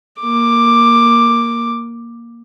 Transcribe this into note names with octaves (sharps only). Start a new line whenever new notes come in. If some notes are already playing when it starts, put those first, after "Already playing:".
A#3 D6